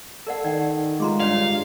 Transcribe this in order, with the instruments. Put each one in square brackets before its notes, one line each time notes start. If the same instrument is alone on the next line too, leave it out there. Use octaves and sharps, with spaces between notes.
[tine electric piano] A4 [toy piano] A#4 D5 F#5
[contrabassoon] D#3 [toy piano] D5 F#5 G5
[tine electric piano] G#3 F4 [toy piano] A#5 C6 D6
[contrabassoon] G2 [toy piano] C#5 D5 [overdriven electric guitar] F5